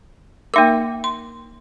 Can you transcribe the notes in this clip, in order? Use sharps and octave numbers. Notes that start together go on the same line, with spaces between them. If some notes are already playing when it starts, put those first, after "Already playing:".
A#3 D#4 A#4 E5 G5 D6
C6